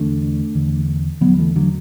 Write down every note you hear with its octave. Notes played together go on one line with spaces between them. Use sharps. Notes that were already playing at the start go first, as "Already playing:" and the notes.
Already playing: E2 D3 A3 D4
E2 D3
E2 D3 F#3 B3
E3 A3
D3 F#3